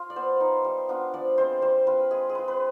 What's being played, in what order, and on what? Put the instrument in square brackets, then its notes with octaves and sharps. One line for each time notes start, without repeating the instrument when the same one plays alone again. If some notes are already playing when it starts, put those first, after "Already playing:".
Already playing: [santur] F4
D5
B3 C5
D#4
G3
B3 D4 F4
F3 D5
G#3 C4 C5
G3 C5
C4 F4 B4
G#3 G#4
G#4
C4 F4 B4
B4